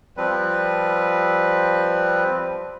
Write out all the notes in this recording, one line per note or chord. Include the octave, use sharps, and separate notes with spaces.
F3 G3 C4 B4